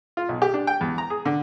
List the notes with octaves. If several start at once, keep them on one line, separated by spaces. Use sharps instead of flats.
F4
B1
G4
D4
G5
E2
A#5
G#4
D3